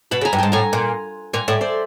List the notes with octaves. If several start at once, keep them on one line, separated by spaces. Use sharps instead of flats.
B2 A5 B5
C#3
G#5 A#5
G2
G#2 G5 A5
A2 G#5 A#5
A#2
A#2 G#5 A#5
A2 D5 E5
C5 D5